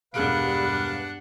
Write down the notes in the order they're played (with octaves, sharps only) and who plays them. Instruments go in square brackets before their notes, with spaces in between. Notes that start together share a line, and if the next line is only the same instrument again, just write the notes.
[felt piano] E1 G#4 D7 [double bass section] G2 [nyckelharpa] D4 F#5 [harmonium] B4 F5